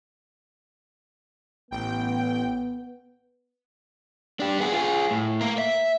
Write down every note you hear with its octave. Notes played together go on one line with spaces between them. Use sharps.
A1 B3 G5
D4 G4
B3 G#4
F4 G#4
A2
A#3 A#4
E5